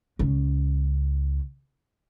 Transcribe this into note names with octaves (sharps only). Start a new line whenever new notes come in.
C#2 C#4